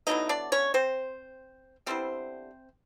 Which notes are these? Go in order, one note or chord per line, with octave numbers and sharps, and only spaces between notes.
D3 F#3 B3 D#4 E4 D#5
D4 D5
C#4 C#5
C4 C5
D3 G3 B3 C4 E4 C5